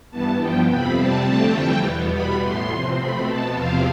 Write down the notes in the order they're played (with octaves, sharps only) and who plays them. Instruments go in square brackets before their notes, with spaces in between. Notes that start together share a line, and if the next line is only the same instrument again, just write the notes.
[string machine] G2 E3 B3 A5
G2 F3 B3 G5
F2 C3 F3 C4 B5
C3 G3 C4 A5
F2 D3 A3 C4 A5
F2 E3 G3 G5
E2 B2 B3
B2 G3 B3 B5
A2 E3 B3 C6
C3 F3 C4
B2 A3 C4 B5
B2 B3 A5
E2 C3 F3 C4 F5